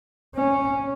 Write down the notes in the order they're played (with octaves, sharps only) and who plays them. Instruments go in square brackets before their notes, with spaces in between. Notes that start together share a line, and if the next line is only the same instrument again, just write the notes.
[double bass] C#4